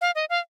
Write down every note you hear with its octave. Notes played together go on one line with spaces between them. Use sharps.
F5
D#5
F5